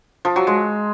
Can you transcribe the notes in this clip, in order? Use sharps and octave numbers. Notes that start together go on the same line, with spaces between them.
F3
F#3
G#3